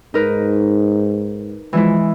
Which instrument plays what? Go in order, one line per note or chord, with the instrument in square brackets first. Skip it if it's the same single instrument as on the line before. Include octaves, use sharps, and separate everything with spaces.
[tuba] G#2 [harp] D#4 A#4 B4
[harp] E3 G#3 E4 [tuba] F3